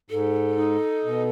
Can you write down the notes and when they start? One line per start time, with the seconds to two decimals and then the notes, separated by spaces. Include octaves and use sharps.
0.10 G#2 A4
0.57 D#4
1.05 B2